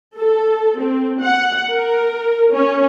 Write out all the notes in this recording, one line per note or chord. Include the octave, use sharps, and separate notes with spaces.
A4
C4
F#5
A#4
C#4